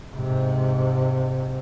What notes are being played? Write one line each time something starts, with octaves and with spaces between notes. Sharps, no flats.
G#2 C3